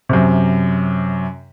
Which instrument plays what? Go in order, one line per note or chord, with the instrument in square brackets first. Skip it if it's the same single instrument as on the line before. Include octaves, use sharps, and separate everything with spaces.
[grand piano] F#2 C3